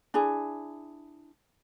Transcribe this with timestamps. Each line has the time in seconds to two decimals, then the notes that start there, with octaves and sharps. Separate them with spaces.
0.14 D4 E4 G#4